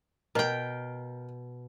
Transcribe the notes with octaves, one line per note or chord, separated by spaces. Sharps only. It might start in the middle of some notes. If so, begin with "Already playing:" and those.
B2 A#4 G5